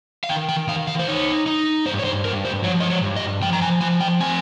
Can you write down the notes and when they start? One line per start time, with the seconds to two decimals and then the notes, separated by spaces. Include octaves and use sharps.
0.24 F5
0.29 D#3 G5
0.49 G5
0.68 D#3 F5
0.87 F5
0.99 C5
1.08 D#4 C#5
1.46 D#4
1.86 G2 C5
1.99 C#5
2.05 C5
2.25 G2 A#4
2.45 C5
2.64 F3 C#5
2.80 D#5
2.90 C#5
3.03 G2
3.16 D#5
3.42 F3 G5
3.53 A#5
3.62 G#5
3.81 F3 G#5
4.01 G5
4.20 C4 G#5